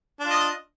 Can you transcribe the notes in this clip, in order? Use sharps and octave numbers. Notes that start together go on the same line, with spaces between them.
D4 F4 D#5